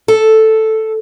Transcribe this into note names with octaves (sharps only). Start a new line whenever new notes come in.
A4